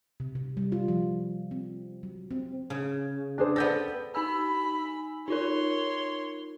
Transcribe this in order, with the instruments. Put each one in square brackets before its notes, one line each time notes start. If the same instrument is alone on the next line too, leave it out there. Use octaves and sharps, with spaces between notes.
[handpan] C3
C3
G3
F4
F3
C4
F#3
C4
[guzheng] C#3
[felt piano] D4 G#4 C5
[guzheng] B3 G4 A4 [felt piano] D5 G6 A#6
[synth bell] D#4 G#5 E6 [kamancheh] B5
[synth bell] D#4 F4 A#4 [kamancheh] C#5 C6